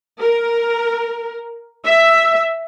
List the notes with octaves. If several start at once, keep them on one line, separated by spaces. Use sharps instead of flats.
A#4
E5